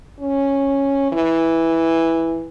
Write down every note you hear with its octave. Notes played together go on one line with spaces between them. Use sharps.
C#4
E3